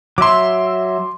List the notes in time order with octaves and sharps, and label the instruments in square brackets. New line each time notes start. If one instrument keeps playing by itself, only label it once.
[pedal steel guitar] F#3 E5 [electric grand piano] C6 D6